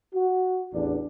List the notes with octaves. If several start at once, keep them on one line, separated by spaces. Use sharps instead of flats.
F#4
A1 E2 D4